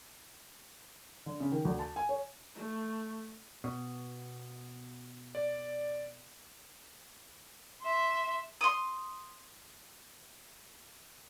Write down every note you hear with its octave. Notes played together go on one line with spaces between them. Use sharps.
D3
C#3
D#3
D2
A5
G#5
C#5
A3
B2
D5
E5 C6
C6 D#6